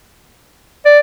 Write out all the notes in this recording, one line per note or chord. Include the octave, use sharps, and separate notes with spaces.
D5